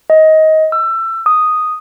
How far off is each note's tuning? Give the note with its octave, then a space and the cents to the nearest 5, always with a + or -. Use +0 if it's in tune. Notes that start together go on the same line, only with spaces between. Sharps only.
D#5 +20
E6 +25
D#6 +0